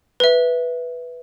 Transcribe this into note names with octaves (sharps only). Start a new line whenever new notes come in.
B4 E5